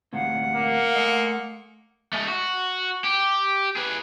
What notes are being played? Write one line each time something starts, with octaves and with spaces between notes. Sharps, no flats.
D2 A2 C3 F5 F#5
A#3
A3 D#5
G#3 A3
F#4
G4
G#4 B4